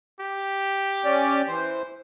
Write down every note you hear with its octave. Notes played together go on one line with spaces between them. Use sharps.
G4
C#4 D5
E3 C5